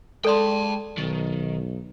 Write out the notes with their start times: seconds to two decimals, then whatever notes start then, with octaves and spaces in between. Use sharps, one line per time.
0.25 G#3 A4 D5 G5 A5 C6
0.98 B1 D#3